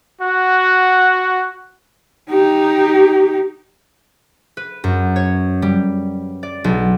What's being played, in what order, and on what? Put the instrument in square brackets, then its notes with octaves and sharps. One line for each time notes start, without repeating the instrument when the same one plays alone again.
[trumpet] F#4 [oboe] F#5
[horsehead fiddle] D#4 G4
[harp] B4
F#2
C#5
G3
D5
B1